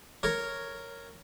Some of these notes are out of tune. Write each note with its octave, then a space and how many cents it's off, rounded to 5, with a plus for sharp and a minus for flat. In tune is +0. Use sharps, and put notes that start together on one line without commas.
A#4 -5 C#5 +0